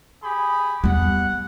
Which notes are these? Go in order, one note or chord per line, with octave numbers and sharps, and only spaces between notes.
G4 G#4 B5
E2 G3 F#5